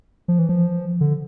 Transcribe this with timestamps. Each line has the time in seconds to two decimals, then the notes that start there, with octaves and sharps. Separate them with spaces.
0.28 F3
0.39 E3
0.49 F3
1.01 D3